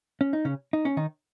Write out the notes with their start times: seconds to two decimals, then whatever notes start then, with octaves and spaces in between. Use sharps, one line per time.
0.21 C#4
0.33 D#4
0.45 C#3 C#4
0.73 D#4
0.85 C#4
0.97 D#3 D#4